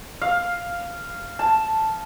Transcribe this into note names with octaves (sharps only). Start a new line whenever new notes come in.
F5
A5